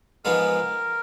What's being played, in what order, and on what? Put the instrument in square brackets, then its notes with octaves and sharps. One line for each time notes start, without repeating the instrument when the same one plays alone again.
[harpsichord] G#2 F3 G#3 B3 [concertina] A#4